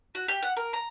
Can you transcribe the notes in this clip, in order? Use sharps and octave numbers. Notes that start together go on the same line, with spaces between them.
F#4
G4
F#5
A#4
A#5